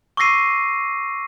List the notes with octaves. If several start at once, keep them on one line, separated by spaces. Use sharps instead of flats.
C#6 D6 E6 A#6 C7 D#7